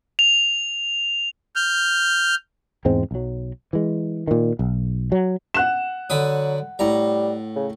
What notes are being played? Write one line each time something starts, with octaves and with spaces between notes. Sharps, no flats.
F7
F6 G6
E2 G#2 G#3 C4
B1 F#3
E3 G#3
A#2 D#3
B1
F#3
F#5 F#6 E7
D3 F#3 B5 D#6
A2 G3 A#5
C#3